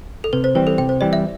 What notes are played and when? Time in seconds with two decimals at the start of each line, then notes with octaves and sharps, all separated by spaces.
0.24 A4
0.33 C3 B4
0.44 C5
0.55 E3 G3 C4 B4
0.67 A4
0.78 C3 G5
0.89 C5
1.01 E3 G3 C4 D5
1.13 E5